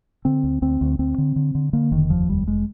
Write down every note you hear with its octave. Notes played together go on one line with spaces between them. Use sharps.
D3 C4
D2
D2 C4
D2
D2 C4
D3
D3
D3
D3 A#3
F1 D#3
D#2 F3
F1 G3
F1 G#3